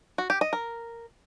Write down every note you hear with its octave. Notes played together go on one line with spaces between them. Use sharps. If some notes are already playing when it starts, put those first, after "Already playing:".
F#4
G4
D#5
A#4